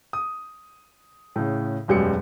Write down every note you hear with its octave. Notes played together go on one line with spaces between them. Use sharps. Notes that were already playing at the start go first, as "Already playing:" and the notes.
D#6
A2 C#3
E1 F#2 G3 G#3 C#7